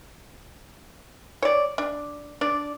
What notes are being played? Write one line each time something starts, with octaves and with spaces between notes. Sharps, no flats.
C#5 D5
D4
D4 D5